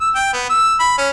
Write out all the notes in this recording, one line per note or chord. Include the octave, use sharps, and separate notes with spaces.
E6
G5
B3
E6
B5
C#4